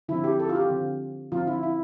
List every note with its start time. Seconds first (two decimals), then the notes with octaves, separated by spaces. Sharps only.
0.09 D3 F3 C4 E4
0.24 G4
0.40 A4
0.49 F4
0.55 G4
0.70 D3 F3 C4
1.32 D3 F3 A3 C4 F4
1.47 E4
1.63 E4